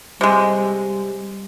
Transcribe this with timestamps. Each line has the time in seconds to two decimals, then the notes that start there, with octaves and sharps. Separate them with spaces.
0.21 C3 G3 G#3